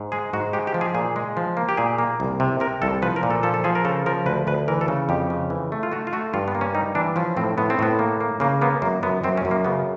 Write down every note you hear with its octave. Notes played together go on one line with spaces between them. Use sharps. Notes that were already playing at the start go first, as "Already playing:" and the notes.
Already playing: G#2
G#3 G#4
G#2 F#4
G#3 G4
G4
F3
G#4
A#2 G#4
G#3
F3
A#3
G4
A#2 G#4
A#3
C2
C3
C3 A#4
C2 A4
F3 B4
A#4
A#2
A4
F3 A4
A4
F3 G#4
A#4
C#3 A4
F3 A#4
D2 B4
D2 B4
E3 A#4
A4
C#3
F2 G4
C#3
E3
A3
F4
A3 F#4
F4
A3 F#4
G2 F4
B3
A#3
C#4
G3 D#4
E3 D4
F3 C#4
A2 C4
A2 B3
C4
A2 B3
A#3
A#3
C#3 A#3
A#3 B3
F#2 A#3
F#2 B3
F#2 C4
C#4
F#2
A#3
C#3 B3